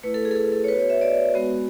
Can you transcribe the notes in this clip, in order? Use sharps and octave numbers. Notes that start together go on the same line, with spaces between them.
A3 E4 B4
A4
G#4
A4
G#4
A4
C#5
B3 F#4 B4
C#5
E5
D5
G#3 B3 F#4